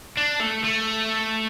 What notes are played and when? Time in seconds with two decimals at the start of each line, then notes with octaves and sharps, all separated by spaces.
0.17 D4
0.40 A3
0.64 A3